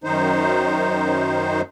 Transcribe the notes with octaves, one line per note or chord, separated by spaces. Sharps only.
F#2 D#3 D#4 C5